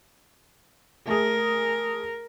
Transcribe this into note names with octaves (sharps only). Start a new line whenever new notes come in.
A3 G#4 A#4